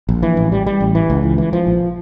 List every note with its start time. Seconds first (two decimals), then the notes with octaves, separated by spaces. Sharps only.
0.09 A#1
0.23 E3
0.37 A1
0.52 G3
0.66 G3
0.80 A1
0.95 E3
1.10 C#2
1.23 E3
1.38 E3
1.53 F3
1.67 A#1